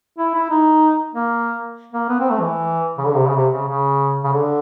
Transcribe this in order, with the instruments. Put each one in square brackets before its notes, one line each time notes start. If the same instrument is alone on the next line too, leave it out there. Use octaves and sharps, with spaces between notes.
[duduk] E4
E4
D#4
A#3
A#3
B3
C4
A3
E3
C#3
D3
C3
C#3
C3
C#3
C#3
C#3
D3